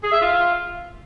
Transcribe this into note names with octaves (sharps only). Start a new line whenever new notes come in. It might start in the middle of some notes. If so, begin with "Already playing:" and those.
G#4
E5
F4